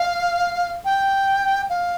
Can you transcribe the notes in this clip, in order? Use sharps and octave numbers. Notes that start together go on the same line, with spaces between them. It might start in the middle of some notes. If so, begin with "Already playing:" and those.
Already playing: F5
G5
F5